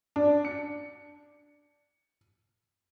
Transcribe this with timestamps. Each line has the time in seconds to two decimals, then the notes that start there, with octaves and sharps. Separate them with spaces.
0.16 D4
0.45 C#7